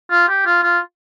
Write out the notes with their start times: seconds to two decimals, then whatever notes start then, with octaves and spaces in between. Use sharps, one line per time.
0.11 F4
0.28 G4
0.46 F4
0.63 F4